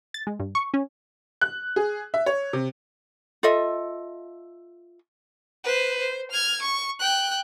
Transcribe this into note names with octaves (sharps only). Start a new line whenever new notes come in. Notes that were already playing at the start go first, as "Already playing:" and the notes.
A6
G#3
G2
C#6
C#4
F#6
G#4
E5
C#5
C3
F4 A4 D#5 E5
B4 C5
C5
F6 G#6
C#6
G5 F#6